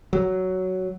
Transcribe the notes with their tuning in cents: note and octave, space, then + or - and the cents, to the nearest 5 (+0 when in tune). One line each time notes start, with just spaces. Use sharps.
F#3 +10